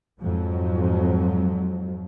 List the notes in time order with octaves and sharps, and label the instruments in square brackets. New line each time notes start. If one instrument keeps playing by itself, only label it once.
[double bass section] F2 G#2 F3 F#3